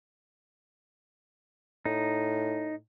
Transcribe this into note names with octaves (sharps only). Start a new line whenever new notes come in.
A2 D#4